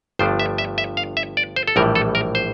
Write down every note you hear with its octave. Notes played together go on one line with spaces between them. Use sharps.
G1 G2 F3 A3 D4 C5
E5
E5
E5
F5
E5
D5
C5
A4
A#1 A2 E3 G3 A#4
A4
A#4
C5